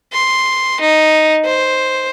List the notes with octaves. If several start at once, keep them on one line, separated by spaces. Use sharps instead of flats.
C6
D#4
C5